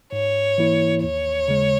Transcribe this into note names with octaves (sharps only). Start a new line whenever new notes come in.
G#2 C#5
E3 A#3 E4
D#2 C#5
C#3 G#3